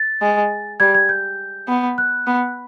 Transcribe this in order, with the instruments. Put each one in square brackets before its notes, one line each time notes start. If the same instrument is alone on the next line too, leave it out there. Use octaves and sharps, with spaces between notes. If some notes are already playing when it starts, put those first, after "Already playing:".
Already playing: [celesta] A6
[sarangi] G#3
[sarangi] G3 [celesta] G#6
[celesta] G#6
G6
[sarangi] B3
[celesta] F#6
[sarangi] B3